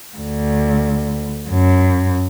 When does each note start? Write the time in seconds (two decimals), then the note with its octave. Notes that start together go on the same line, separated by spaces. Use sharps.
0.18 D2
1.49 F#2